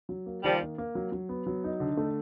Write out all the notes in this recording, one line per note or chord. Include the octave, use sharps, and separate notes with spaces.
F#3
A#3
D#3 F3 G3
A#3
A#3
F#3
F#3
B3
F#3
D#4
D3
A3